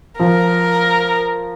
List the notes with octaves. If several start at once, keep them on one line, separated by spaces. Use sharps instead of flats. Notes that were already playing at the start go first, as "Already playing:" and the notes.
F3 A#4